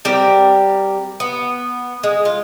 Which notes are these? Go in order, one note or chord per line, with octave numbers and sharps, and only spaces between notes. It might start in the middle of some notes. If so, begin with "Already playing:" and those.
G3 C4 G4 A#4
B3
G#3
F4